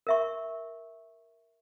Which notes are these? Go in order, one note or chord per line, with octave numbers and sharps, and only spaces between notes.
A#4 E5 C#6